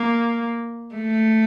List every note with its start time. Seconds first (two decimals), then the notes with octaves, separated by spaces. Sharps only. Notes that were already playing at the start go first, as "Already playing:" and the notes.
Already playing: A#3
0.95 A3